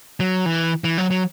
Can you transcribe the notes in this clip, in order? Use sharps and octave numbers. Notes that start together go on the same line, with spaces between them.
F#3
E3
E3
F#3
F#3